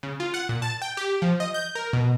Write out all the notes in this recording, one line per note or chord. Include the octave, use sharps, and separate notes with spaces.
C#3
F4
F#5
A#2
A5
G5
G4
F3
D#5
G6
A#4
B2